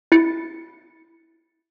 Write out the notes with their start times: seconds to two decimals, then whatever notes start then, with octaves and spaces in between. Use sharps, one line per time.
0.12 E4 A6 C#7